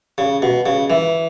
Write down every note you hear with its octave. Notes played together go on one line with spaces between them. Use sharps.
C#3
B2
C#3
E3